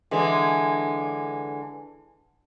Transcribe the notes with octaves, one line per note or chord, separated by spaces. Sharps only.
D3 E3 G#3